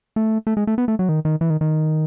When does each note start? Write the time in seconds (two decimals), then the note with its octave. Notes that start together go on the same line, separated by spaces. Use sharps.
0.16 A3
0.47 A3
0.57 G#3
0.67 A3
0.78 B3
0.88 A3
0.99 F#3
1.09 D#3
1.25 D#3
1.41 E3
1.50 D#3
1.61 D#3